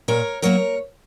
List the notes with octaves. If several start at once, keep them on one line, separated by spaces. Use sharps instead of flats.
A#2 A#4 C#5
F#3 A#3 A#4 C#5